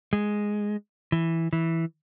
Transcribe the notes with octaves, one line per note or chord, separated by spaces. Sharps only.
G#3
E3
E3